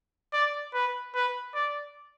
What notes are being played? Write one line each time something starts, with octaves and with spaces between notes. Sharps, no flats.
D5
B4
B4
D5